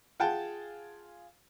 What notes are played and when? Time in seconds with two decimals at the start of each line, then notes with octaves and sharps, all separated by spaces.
0.20 F4 G#4 F#5 G5 A5